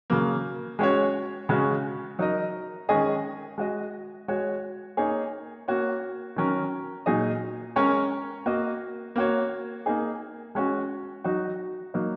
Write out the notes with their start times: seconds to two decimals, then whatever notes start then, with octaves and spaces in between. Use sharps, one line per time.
0.10 C#3 F#3 A#3
0.79 G#3 C#4 F#4 C#5
1.49 C#3 G#3 C#4 F#4
2.19 F#3 D#4 A#4 D#5
2.89 D#3 G#3 C#4 G#4 D#5
3.58 G#3 F#4 D#5
4.28 G#3 F#4 C#5
4.97 A#3 D#4 G#4 C#5
5.68 A#3 F#4 C#5
6.36 D#3 F#3 C#4 A#4
7.06 A#2 F#3 D#4 G#4 D#5
7.76 G#3 C#4 A#4 C#5
8.46 A#3 F#4 D#5
9.16 A#3 F#4 C#5
9.86 A#3 D#4 G#4
10.55 G#3 C#4 F#4
11.24 F#3 D#4 F#4
11.94 F#3 A#3 D#4